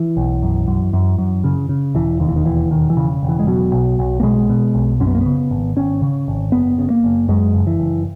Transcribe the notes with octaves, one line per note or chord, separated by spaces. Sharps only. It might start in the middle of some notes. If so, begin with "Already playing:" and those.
Already playing: E3
B1
F#2
F#2
F#2
F#2
C#3
C#3
E1 E3
D#2 D#3
E3
D#3
E1 E3
E1 D#3
E3
C#3
E1
E3
G#3
B2 F#3
B1
B1
A#3
B2 G#3
B2
B1
F#2 C#4
B3
A#3
B3
C#3
G#1
G#1 C#4
C#3
G#1
F#1 B3
C#3
A#3
F#1
F#2 G#3
F#1
E3
F#1